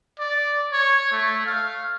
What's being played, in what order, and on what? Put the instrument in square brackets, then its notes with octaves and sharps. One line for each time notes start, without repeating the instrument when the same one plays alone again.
[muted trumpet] D5
C#5
A3
F5